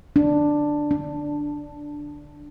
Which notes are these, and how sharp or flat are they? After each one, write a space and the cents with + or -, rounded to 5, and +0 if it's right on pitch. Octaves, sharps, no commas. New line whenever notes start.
D4 +5
D4 -5